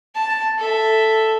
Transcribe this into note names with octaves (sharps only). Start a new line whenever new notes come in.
A5
A4 E5